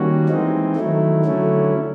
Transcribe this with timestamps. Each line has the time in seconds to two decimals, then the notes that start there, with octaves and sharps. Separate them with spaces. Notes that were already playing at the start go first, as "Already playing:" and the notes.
Already playing: D#3 G3 A#3 C#4 F#4
0.29 E3 G#3 C4 D#4
0.76 D#3 F#3 A3 E4
1.25 D3 F#3 A3 C#4